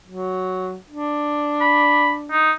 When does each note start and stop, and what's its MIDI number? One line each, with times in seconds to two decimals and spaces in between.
0.08 0.76 54
0.90 2.47 62
1.61 2.12 83
2.31 2.51 63